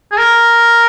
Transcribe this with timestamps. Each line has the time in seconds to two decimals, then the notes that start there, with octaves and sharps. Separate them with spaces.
0.12 G#4
0.18 A#4